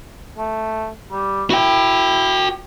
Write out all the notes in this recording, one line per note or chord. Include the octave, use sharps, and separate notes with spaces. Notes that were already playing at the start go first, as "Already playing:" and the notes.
A3
G3
E4 F#4 G5